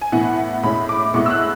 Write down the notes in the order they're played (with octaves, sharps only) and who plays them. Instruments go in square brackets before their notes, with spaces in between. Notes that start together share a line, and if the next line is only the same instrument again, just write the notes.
[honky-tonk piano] G#5
A2 E3 B3 E4 F#5
A2 G#3 C#4 E4 B5
D6
A2 G#3 B3 E4 C#6
E6
F#6